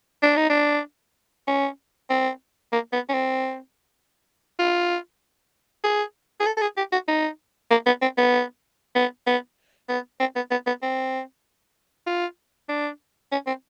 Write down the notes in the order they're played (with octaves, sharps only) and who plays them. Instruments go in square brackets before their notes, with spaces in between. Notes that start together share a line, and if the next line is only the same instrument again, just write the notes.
[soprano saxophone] D4
D#4
D4
C#4
C4
A#3
B3
C#4
C4
F4
G#4
G#4
A4
A4
G#4
G4
F#4
D#4
A#3
B3
C4
B3
B3
B3
B3
C4
B3
B3
B3
C4
F4
D4
C#4
C4